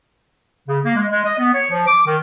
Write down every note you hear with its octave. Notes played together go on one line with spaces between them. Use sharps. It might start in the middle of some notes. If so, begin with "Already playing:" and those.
C#3
A#3
G#3
G#3
D#5
B3
C#5
F3
D6
D#3